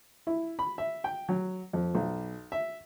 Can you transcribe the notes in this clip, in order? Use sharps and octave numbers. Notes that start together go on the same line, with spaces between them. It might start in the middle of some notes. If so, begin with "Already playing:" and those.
E4
B5
E5
G5
F#3
F2
B1
E5